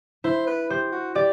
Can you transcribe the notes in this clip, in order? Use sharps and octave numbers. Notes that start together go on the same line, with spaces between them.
E4 C5
B4
G4 C5
F#4
G4 D5